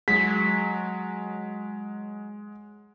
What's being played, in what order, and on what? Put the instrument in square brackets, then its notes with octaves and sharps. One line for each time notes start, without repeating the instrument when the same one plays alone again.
[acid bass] F#3 [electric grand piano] G#3 [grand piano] B6